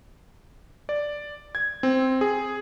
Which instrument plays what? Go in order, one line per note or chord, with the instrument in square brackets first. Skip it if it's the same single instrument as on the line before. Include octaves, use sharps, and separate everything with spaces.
[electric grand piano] D5
G#6
C4
G#4